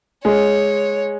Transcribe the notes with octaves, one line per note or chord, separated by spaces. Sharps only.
G#3 C#5